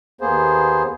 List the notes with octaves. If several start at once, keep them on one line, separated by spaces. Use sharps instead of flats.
D#2 A#3 B3 G#4 C5